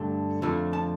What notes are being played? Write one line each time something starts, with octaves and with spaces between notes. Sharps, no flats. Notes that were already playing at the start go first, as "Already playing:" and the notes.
Already playing: G2 D3 A3
F2 D3 F3 A3
A5